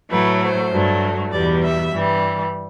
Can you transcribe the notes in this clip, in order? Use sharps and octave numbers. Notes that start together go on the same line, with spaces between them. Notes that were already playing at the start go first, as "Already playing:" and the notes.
A2 F#3 A3 B4
C5
G2 F#3 A3
E2 B2 G3 D5
E5
G2 E3 G3